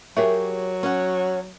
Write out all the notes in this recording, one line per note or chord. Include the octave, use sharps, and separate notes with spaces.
F#3 G4 G#4 A#4 C#5 E5
C#4 F#5